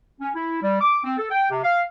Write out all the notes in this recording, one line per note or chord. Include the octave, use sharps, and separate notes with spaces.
C#4
E4
G3
D6
C4
A4
G5
C3
F5